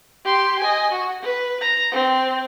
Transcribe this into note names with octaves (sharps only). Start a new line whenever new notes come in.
G4 C6
D#5 G#5
F#4
B4
A#5
C4